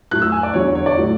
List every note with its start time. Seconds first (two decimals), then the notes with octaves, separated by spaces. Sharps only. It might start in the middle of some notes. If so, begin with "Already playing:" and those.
0.11 A2 F#3 A3 F#6
0.22 E6
0.32 G#5
0.43 D5
0.53 E2 D3 F#3 C#5
0.75 C#5
0.86 D5
0.97 A2 F#3 A3